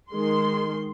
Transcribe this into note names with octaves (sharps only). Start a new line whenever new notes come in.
D#3 G#3 C6